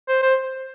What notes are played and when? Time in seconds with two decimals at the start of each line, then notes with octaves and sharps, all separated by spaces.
0.08 C5
0.22 C5